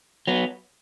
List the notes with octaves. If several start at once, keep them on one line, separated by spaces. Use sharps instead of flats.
F#3 B3